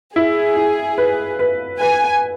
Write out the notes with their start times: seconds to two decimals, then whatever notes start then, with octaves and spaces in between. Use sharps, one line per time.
0.16 E4 G#4
0.56 E4
0.98 B4
1.39 B4
1.81 B4 G#5